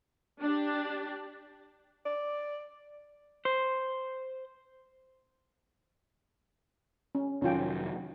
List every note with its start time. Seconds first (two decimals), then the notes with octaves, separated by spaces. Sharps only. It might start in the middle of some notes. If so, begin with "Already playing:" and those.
0.41 D4 G4
2.06 D5
3.45 C5
7.15 C#4
7.42 F1 D#3 F#3 C#4 F4 G5